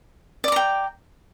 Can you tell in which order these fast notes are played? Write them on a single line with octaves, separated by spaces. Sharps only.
D5 D6 A#5 G5